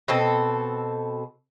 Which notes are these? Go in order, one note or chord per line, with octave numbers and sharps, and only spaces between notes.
B2 C4 A4